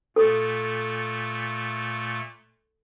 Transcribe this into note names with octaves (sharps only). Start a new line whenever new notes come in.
A#2 A3 A4